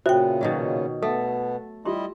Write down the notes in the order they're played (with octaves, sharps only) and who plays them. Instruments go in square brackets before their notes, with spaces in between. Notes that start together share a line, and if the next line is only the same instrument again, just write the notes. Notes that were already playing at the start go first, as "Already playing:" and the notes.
[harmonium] A#2 C#3 [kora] B3 [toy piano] F4 C5 E5 [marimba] F#4 G5
[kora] B2 D#3 F#3
[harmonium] B2 B3 [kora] A3 [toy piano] A4
[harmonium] G3 E4 D#5 [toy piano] F4 G4 C6